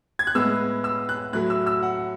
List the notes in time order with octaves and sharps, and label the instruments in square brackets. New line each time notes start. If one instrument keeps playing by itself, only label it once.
[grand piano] G#6
F#6
A2 G#3 B3 E6
E6
F#6
A2 F#3 A3 F#6
E6
E6
F#5